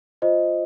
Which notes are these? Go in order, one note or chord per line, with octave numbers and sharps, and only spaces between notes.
F4 C5 D#5